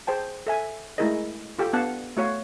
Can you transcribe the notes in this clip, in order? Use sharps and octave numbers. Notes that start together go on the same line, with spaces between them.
G#4 C5 G5 A5
A4 E5 G#5
G#3 A3 E4 G#4 A#4 D#5
F4 G4 A4 G5
B3 D4 F5 F#5 A5
A3 F#4 C#5 F5